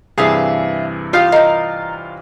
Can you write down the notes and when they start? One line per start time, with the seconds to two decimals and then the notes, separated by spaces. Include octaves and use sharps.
0.18 G2 C3 E3 G#4 E5 F5 A5
1.13 D#4 F4 G4 F5
1.32 D#4 A#4 D#5